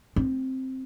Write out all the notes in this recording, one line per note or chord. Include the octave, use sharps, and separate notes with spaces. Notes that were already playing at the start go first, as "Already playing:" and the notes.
C4